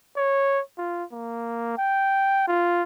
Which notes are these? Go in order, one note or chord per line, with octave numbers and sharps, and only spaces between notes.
C#5
F4
A#3
G5
F4